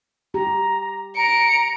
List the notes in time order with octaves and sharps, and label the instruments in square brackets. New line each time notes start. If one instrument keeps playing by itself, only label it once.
[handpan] G4 [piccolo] A#5
[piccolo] A#5 [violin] C#7 D7